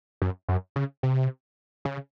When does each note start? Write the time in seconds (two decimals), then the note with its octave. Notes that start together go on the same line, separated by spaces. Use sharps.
0.22 F#2
0.49 F#2
0.76 C#3
1.03 C3
1.85 C#3